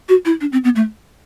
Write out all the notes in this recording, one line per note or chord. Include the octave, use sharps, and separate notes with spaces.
F#4
E4
D4
C4
B3
A3